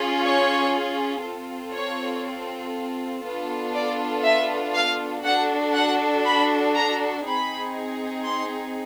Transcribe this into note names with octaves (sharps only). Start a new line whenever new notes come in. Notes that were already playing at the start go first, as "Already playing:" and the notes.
Already playing: C#4 F4 G#4
C#5
C4 F4 A4
C#5
B3 D4 F4 A4
D5
E5
F5
D4 F#4 A4 F#5
F#5
B5
A#5
C4 D#4 G#4 B5
C6